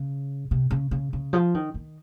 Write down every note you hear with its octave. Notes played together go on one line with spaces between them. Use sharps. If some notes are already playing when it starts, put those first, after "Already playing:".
Already playing: C#3
C3
C#3
C#3
C#3
F3
D#3
D#3